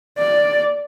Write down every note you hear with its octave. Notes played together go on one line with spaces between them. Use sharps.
D5